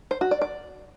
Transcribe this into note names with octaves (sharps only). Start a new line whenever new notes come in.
C5
F#4
D5
D5